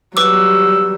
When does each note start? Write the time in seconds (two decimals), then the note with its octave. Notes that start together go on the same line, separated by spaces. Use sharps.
0.17 F#3 G3 B4 D6 E6